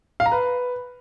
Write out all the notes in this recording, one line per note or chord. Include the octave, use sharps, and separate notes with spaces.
F5
A#5
B4